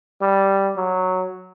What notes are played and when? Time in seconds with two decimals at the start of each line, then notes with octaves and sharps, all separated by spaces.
0.22 G3
0.77 F#3